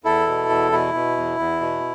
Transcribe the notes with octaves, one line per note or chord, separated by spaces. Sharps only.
E2 E4 A4
B2
E2
B2 E4
B2
E2
E2
B2